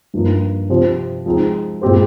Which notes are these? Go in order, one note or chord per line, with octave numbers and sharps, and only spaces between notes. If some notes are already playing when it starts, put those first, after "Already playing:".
G2 F3 A#3 D#4
C3 F3 C4 G4 C5
F3 G#3 C4 D#4
A#2 G#3 C4 G4 C5